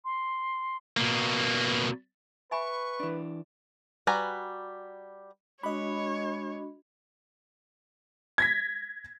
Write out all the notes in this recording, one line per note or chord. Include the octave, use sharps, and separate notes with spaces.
C6
B2 A#3
B4 E5 G#5 B5 C#6
E3 D4
G3 F#4 B4 G#5 A#5
G#3 D4 F#4 C#5 D#5 B5
G#6 A#6 B6